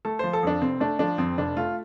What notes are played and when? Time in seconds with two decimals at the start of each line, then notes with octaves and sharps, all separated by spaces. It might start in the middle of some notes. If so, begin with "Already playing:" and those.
0.05 A3 A4
0.19 F3 C5
0.33 A4
0.43 F2 D4
0.61 F1 C4
0.80 A3 D4
0.99 F3 D4
1.18 F2 C4
1.38 F1 D4
1.56 A3 F4